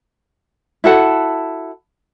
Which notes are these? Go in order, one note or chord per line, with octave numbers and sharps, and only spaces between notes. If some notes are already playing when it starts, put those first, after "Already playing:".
E4 F#4 A4 F#5